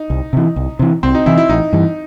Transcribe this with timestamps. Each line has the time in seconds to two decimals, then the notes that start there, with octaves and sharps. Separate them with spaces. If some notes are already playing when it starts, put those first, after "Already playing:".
Already playing: D#4
0.10 C2
0.33 C3 E3
0.56 C2
0.79 C3 E3
1.03 C2 C4
1.15 D#4
1.26 C3 E3 E4
1.38 E4
1.49 A1 D#4
1.73 G2 E3